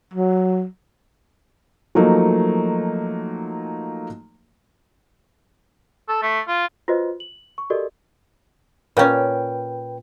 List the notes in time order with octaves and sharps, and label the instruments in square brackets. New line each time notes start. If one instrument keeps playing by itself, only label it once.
[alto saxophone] F#3
[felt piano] F3 F#3 A3 A#3 D#4
[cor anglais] A4
A3
F4
[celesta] F4 F#4 B4 C5 D#5
F#7
C#6
F#4 G4 A4 A#4 D5 D#5
[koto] A#2 C#4 [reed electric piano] B4 G5